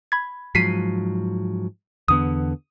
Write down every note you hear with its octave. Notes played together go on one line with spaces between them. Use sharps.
B5 G#6
G#2 F3 F#3 B6 C7 D#7
E2 D3 B3 D#6